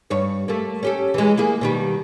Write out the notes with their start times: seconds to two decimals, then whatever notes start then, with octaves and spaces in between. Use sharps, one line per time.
0.10 G2 C#5
0.48 A3 A#3
0.83 C#4 G4 A4
1.14 E3 G#3
1.38 A#3 E4 G#4
1.61 B2 D#3 G3